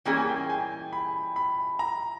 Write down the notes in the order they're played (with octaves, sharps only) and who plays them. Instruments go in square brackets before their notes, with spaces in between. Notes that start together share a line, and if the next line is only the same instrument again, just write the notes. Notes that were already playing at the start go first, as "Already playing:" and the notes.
[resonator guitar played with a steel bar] E3 G3 A#3 C#4 G#4 [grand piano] G5
[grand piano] G#5
G5
G#5
B5
B5
A#5